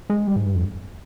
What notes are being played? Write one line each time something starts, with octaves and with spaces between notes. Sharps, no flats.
G#3
G3
G#2
G2
F2